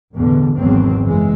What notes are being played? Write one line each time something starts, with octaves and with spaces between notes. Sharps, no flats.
A1 E2 B2 D3
G#1 E2 B2 F#3 C4
F#1 E3 G#3